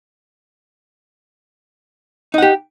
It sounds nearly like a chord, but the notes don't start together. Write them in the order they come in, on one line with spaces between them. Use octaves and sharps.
D#4 F#5 G4